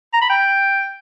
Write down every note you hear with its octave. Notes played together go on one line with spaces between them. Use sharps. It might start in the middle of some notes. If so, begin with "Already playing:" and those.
A#5
B5
G5